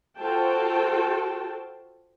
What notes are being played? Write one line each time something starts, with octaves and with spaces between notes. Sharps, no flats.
F4 F#4 A4 C5 G5 A5